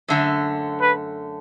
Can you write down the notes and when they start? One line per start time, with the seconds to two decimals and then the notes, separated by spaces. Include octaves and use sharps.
0.08 F#2 D3 A3
0.81 B4